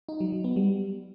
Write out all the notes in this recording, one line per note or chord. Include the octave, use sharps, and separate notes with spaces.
D#4
F#3
F#3
B3
G3